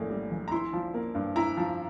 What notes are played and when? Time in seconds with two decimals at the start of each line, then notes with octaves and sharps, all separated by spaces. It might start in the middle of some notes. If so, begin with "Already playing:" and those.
Already playing: A#1 A2 A#3
0.10 G3
0.31 A#1
0.48 A#5
0.51 E4 C6
0.73 F3
0.94 A#3
1.15 G2
1.36 E4 A#5
1.57 F3